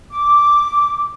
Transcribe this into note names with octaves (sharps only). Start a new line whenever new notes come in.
D6